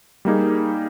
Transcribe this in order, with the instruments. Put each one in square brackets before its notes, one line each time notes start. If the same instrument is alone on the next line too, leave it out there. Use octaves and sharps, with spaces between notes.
[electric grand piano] G3 A#3 D#4 G#4